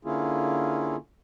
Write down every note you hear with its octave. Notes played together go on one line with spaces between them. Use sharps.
D3 A#3 C#4 E4 F4 G#4